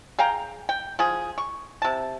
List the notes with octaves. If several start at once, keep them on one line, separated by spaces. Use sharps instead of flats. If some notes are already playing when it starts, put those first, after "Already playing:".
G#4 F5 G5 A#5
G5
F3 G#4
C#6
C3 A5